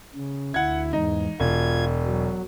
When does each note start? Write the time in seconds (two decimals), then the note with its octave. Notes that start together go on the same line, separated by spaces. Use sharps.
0.15 C#3
0.54 D2 E4 F#5 G#6
0.93 E2 G#2 D#4
1.40 E1 F4 G#6
2.06 F#3